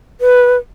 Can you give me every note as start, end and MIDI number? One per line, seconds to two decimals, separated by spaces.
0.21 0.57 71